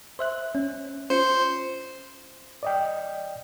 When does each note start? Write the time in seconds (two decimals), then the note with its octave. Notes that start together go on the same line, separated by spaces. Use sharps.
0.19 C5 E5 F#6
0.55 C#4
1.10 C#4 F4 C5 C#7
2.63 D5 D#5 G5